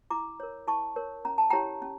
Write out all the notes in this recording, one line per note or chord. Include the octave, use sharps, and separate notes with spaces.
E4 A#5 D6
A#4 C#5
E4 A5 C#6
A#4 C#5
C#4 A#5
A5
E4 G4 C#5 G5 A#5
C#4